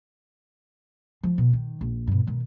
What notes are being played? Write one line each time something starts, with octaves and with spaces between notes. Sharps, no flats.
F3
B2
D#3
A#1
G2 B2
B2 D#3